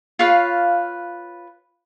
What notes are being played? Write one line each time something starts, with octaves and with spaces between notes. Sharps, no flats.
F4 B4 C#5 F5